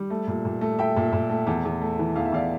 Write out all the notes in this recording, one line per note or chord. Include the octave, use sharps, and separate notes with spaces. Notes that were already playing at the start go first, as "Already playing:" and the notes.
Already playing: G3
A3
A#2
A#2
A3
A3 E5 G5
A#2
A#2
A3
E2
E2
A3
E3
E2 F5
E5
E2 D5 F5